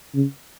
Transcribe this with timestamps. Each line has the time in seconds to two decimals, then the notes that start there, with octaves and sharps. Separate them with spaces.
0.15 C#3